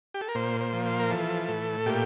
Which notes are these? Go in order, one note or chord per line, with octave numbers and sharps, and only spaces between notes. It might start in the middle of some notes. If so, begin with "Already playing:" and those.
G4
A4
A#4
A#2 C5
C5
F3
C5
A#4
E3 A4
A2
A#2 G4